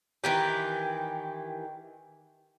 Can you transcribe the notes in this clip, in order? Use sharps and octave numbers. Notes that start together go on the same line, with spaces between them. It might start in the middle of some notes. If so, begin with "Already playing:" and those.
D#3 E3 G4